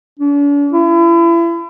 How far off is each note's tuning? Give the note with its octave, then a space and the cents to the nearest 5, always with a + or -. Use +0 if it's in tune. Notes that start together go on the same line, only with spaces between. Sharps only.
D4 -45
E4 +35